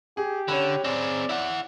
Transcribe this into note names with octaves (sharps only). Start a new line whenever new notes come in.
G4 G#4
D3 C#4 C#5 B5
C4 G#4 D5
E4 F#5